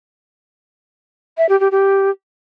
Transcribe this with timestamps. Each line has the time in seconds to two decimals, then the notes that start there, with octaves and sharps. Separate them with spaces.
1.38 E5
1.49 G4
1.60 G4
1.71 G4